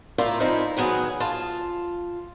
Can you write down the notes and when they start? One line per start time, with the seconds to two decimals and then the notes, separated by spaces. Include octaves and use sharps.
0.18 A2 F4 A#4 C5 D5 E5
0.40 F3 C4 D#4 E4
0.77 D#3 F#3 B3 G#4
1.20 F4 A5